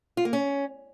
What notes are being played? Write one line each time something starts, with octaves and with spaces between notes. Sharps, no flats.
F4
A#3
C#4